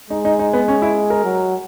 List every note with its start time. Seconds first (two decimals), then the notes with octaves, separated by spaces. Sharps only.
0.10 G#3 D#4
0.25 D#4
0.39 D#4
0.53 B3
0.68 C#4
0.82 E4
1.10 A#4
1.25 F#3